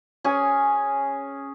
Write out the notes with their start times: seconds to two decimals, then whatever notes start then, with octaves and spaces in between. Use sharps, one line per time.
0.24 C#4 G#4 G#5